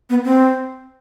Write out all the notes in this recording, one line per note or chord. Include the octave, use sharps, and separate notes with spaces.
B3
C4